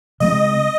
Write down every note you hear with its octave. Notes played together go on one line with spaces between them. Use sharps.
C#3 G#3 C4 D#5